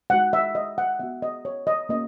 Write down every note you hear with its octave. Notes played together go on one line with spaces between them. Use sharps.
G#3 D#4 F#4 F#5
E5
D#5
F#5
B3 F#4 E5
D#5
C#5
D#5
A#3 C#4 F#4 D#5